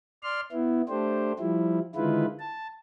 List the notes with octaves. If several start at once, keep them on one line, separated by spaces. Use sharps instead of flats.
D5 C6 F6
B3 E4
A3 D4 G4 C5
F3 G3 E4
D3 D#3 G#3 E4 F4 B4
A5